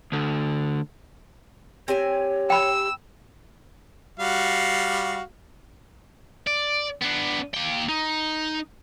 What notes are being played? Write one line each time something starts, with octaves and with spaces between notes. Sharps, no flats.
D2 D3
C4 G4 C#5 G#5
G5 B5 E6
G3 F#4 F5
D5
B3 D4
A#3 G5
D#4